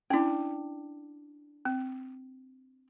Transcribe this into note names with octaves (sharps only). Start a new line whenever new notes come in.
C#4 D4 E4 G5
C4